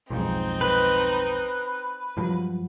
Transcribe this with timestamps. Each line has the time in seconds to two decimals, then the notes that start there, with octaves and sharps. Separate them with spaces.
0.10 B1 F2 G#2 C4 D#4
0.61 B4
2.17 G2 F3 F#3